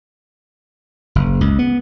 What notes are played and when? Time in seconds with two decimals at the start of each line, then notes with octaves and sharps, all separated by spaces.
1.15 F#1
1.41 C#2
1.59 B3